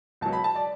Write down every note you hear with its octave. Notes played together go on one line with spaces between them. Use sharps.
C#2 B2 F#3 A5
B5
A5
D5